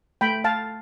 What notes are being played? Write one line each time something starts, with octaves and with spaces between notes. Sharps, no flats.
A3 G5 B5
F5 A5